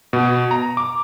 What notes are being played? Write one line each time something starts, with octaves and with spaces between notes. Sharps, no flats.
B2
A#5
D6